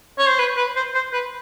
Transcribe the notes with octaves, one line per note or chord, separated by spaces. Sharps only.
C#5
C5
B4
B4
C5
C5
B4